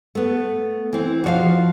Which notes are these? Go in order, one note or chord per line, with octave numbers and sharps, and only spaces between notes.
A3 B3
E3 C4
F3 F#4 C#5 F5